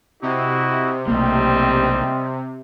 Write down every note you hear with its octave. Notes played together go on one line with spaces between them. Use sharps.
C3 E4 F#4 D#5
B1 G3 A3 A#3 C4 D#5